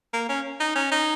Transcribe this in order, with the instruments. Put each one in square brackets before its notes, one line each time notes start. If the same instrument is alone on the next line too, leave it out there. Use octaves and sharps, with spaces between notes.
[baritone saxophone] A#3
C#4
D#4
C#4
D#4